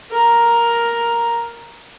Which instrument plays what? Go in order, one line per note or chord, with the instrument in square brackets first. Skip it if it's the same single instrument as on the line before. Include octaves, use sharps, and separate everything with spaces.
[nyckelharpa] A#4 A#5